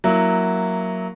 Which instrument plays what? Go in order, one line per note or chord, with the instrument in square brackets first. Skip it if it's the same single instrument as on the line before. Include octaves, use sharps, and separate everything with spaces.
[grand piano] F#3 A#3 E4